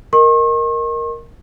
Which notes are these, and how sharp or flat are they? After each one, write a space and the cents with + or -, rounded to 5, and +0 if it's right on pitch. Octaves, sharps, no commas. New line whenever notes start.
A#4 +0 D#5 +0 C#6 -45